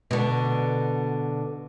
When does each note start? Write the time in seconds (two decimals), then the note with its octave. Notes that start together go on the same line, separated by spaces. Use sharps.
0.11 B2 D3